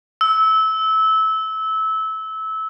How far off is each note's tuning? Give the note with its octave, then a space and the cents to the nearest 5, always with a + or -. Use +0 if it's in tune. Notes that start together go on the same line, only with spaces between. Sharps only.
E6 -20